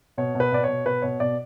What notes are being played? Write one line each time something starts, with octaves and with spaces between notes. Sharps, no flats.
B2 C#5
B2
B4
B2 D5
C#5
B2
B2 B4
B2 C#5
B2 D5